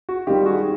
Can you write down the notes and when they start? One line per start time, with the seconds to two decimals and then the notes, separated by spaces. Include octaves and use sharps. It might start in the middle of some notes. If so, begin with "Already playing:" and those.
0.09 F#4
0.27 D#3 G3 F4 G4
0.46 F#4 G#4